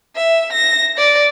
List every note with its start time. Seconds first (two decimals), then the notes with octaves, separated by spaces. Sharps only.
0.16 E5
0.52 A#6
0.98 D5